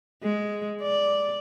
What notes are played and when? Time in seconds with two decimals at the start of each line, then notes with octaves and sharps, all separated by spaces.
0.23 G#3
0.82 D5